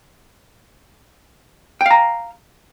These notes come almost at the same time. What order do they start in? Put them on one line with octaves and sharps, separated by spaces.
G5 F5 A#5